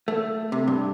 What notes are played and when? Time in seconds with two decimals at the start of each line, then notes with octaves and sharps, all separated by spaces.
0.08 A3
0.52 C3
0.68 G2